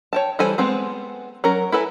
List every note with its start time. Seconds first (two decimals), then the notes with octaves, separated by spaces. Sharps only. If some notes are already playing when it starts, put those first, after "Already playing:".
0.13 C#5 G5 A5
0.39 E3 G3 A4 C5 G#5
0.58 G#3 B3 C4 C5
1.44 F#3 C#4 A#4
1.72 E4 A4 B4 G#5